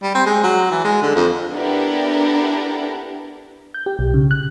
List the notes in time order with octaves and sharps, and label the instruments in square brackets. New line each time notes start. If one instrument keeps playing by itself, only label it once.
[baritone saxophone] G3
C4
G#3
F#3
E3
G#3
D3
F2
[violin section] B3 D4 E4 G4 A4 A#4
[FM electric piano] G6
G4
B1
C#3
F#6